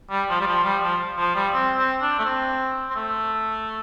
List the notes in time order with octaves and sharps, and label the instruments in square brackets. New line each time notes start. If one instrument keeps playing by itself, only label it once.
[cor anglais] G3
F3
G3
F3
G3
F3
F3
G3
C4
C4
D4
A3
C4
C4
A3